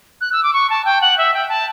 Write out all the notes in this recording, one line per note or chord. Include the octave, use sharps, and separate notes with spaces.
F#6
E6
D6
C#6
A5
G5
F#5
E5
G5
A5